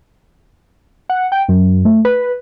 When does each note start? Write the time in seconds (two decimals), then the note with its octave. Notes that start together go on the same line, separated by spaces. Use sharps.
1.10 F#5
1.32 G5
1.49 F#2
1.85 A3
2.05 B4